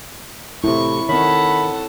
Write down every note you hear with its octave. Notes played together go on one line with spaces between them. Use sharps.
A2 C3 E4 C#6
D#3 C4 A4 C#5 F#5 B5